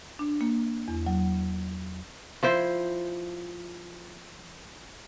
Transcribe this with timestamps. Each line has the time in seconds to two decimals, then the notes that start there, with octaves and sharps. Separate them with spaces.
0.19 D4
0.41 A#3
0.88 E2
1.06 F#3
2.43 F3 E4 C5